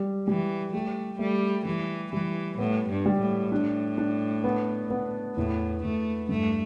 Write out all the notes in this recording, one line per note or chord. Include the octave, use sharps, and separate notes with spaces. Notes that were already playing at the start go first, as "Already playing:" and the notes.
Already playing: G3
E3 G3
A3 G4
G3 A3
E3 G3
E3 G3
A2 B3
G2
G3
A2
D4
D4
B3
B3
E2 A2
E2 A3
G2 A3